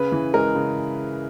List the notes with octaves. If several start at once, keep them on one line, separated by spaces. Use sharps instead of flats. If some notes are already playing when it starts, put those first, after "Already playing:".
Already playing: C#3 B4
E3
G#3 A#4
C#3